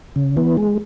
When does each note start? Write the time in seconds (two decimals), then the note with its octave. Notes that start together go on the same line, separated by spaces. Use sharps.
0.16 C#3
0.37 E3 B3
0.57 G#3